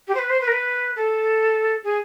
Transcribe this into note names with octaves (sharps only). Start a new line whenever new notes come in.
G4
C5
B4
C5
B4
A#4
B4
A4
G#4